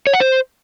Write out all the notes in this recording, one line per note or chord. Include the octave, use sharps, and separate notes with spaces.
C#5
F#5
C5